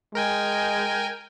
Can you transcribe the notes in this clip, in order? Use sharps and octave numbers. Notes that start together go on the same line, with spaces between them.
G#3 A#4 G5 G#5